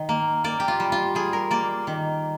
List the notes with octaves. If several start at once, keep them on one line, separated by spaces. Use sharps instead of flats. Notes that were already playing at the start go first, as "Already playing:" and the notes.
Already playing: D#3
A#3
A#3 D5
G4
F4
G3
F4
G3 G#4
A#4
A#3 D5
D#3